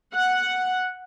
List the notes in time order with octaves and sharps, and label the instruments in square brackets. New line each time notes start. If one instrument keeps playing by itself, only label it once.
[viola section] F#5